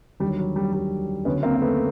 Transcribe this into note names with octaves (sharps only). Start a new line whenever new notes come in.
D#2 D3 F#3 G3
F#3
G3
G3
D2 C#3 F#3 B3 C#4
A#3 C4
A#3
A3 B3